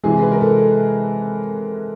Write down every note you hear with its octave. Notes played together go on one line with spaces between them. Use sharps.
C3 E3 G#3 G#4
B4
A#4
A4